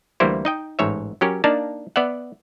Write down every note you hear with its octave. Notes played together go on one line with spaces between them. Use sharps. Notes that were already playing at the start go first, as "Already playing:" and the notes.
D2 E3 G3 A#3 E4 C5
D#4 D#5 G5
A1 G#2 C#5 E5
F#3 C#4 G4 A#4
A#3 D4 D#4 D5 F5 A5
B3 D5 E5 F#5